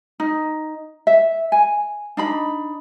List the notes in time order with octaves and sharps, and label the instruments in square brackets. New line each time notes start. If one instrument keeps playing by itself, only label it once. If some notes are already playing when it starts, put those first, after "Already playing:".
[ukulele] D#4
E5
G#5
D4 D#4 B5